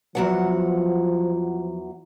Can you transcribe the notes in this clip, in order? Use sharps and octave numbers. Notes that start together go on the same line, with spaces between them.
E2 F3 F#3 F#5